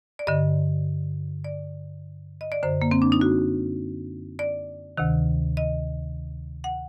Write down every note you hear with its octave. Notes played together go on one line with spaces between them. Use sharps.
D5
G2 D3 D#5
D5
D#5
D5
F#2 D3 C5
A#3
C4
D4
D#4
F#4
D5
D2 C3 D#3
D#5
F#5